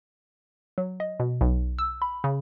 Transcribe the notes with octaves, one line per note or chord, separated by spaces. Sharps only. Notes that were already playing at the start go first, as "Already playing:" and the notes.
F#3
D#5
B2
B1
E6
B5
C#3